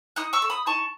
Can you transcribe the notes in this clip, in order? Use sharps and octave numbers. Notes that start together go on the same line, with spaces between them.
D#4 D#6 F#6
C#6 E6
A4
B5 D#6
D#4 A5 C#6